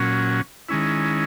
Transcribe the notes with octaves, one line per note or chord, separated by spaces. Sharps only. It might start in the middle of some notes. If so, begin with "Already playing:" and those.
Already playing: A#2 F#3 C#4
D#3 G#3 C#4 E4